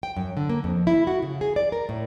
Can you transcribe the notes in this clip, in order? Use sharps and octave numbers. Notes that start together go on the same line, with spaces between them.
G5
F#2
D3
A#3
F2
E4
F#4
C#3
G#4
D5
A#4
A2